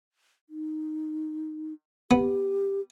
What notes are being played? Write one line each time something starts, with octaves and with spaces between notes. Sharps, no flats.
D#4
B3 G4